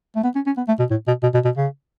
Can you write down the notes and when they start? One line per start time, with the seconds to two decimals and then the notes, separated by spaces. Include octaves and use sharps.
0.16 A3
0.24 B3
0.36 C#4
0.47 C#4
0.58 B3
0.68 A3
0.80 B2
0.91 A2
1.08 B2
1.23 B2
1.34 B2
1.45 B2
1.57 C#3